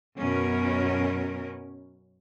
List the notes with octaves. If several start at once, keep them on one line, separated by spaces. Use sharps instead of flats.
F#2 B2 C#4 A#4